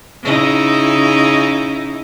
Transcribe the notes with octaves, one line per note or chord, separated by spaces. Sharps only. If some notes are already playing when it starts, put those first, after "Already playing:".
C#3 D#4 E4